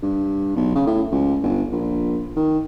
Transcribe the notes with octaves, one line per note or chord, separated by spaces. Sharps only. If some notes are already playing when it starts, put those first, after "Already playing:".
G2
B1
C#3
A2
C#2
G1
A#1
D#3